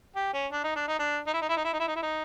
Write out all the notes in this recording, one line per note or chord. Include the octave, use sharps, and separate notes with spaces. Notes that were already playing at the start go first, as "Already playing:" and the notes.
G4
C#4
D4
D#4
D4
D#4
D4
D#4
E4
D#4
E4
D#4
E4
D#4
E4
D#4
E4
D#4